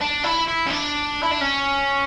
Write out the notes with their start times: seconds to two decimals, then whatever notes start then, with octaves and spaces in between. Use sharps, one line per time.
0.01 D4
0.24 E4
0.47 E4
0.66 C#4
0.70 D4
1.23 E4
1.31 D4
1.41 C#4